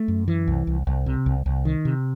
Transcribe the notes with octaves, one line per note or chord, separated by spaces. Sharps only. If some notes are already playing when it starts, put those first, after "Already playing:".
Already playing: A3
F#2
E3
C2
C2
C2
C3
C2
C2
D#3
C3